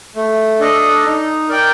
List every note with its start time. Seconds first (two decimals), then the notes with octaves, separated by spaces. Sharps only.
0.16 A3
0.60 D4 A4 D#5
1.04 D#4
1.49 A#4 D5 G5